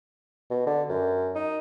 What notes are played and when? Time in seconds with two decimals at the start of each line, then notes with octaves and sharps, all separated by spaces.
0.51 B2
0.67 D3
0.90 F#2
1.36 D#4